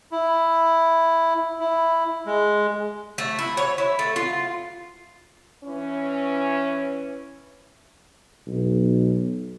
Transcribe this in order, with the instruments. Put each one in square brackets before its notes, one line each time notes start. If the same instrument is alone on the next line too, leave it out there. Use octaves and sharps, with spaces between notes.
[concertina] E4
E4
G#3
[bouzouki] A3
E4
C#5
E4
A3
F4
[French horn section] E3 C#4
[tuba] B1